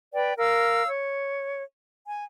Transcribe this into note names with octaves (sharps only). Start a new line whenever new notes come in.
B4 D5 G5
A#4 F5 E6
C#5
G#5